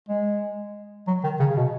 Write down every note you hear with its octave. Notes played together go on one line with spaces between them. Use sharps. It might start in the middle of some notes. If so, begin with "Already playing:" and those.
G#3
F#3
D#3
C#3
C#3
B2